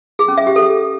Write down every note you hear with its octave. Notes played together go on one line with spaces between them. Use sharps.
G#4
C#4
E5
G4
A4